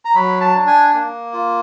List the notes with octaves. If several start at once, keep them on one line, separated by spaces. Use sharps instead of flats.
A#5
F#3 B5
A5
D4
G#5
A#3
F4